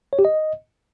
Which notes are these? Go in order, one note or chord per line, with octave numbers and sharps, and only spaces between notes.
C#5
G4
D#5